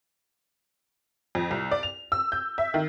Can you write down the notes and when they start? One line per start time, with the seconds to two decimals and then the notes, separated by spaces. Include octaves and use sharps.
1.35 F2
1.51 C2
1.71 D5
1.83 F7
2.12 E6
2.32 G6
2.58 E5
2.74 D#3